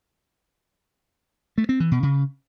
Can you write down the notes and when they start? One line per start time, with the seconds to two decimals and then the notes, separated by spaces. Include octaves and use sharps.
1.58 A3
1.69 C4
1.80 E3
1.91 B2
2.03 C#3